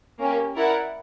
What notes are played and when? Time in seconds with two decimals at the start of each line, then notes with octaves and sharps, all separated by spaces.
0.19 A#3 C#4 G4
0.56 E4 A#4 D5 F#5